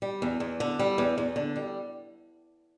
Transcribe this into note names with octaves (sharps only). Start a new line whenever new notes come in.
G3
E2
E2
D3
G3
E2
E2
D3
G3